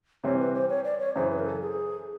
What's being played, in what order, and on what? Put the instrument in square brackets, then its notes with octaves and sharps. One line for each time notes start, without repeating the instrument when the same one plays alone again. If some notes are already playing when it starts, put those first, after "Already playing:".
[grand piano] C3 E3 G3 C4 [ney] C#5
[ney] B4
C5
C#5
D5
C#5
[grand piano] F#2 C#3 E3 [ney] C5
[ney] B4
A#4
A4
G#4